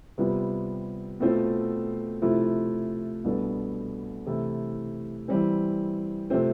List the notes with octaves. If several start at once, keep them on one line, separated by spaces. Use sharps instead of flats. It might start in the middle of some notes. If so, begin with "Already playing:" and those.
C3 G3 B3 F4
B2 A3 C4 F4 A4
C3 F3 A3 E4
C2 B2 B3 D4 A4
C3 E3 A3 E4
E3 G3 C4
C3 F3 A3 C4